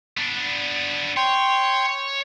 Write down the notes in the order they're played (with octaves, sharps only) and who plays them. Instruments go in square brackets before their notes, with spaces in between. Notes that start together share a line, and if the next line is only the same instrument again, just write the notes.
[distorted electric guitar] B3 D4
[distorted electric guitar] C#5 [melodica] G5 C6